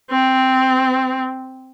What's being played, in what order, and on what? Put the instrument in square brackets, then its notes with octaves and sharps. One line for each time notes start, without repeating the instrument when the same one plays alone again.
[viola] C4